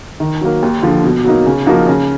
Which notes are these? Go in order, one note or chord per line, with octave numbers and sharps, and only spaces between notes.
D#3
F#3 A#3
D#2
D3 F3
B2
F#3 A#3 D#4
C#3
F3 A#3 D#4 F#4
C#3